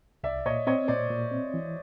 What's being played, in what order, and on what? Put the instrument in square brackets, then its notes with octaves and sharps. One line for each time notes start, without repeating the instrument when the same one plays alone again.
[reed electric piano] C2 [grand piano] D5 E5
[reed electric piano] A#2 [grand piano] C#5 D#5
[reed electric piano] C4 [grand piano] C#5 D#5
[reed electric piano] A#2 [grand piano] C5 D5
[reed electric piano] A#2
C4
E3